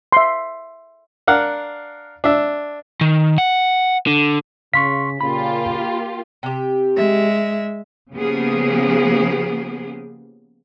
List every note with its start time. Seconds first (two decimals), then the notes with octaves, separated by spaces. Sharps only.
0.12 E5 C6
1.27 D4 A#4 F5 F#5
2.24 D4 E5
3.01 D#3
3.38 F#5
4.07 D3
4.74 C#3 F5 C6 C#6 B6
5.21 A#2 C#3 A#3 F4 G4 B5
6.43 C3 G4
6.95 G#3 E5
8.13 C#3 F3 A#3 B3 G4 G#4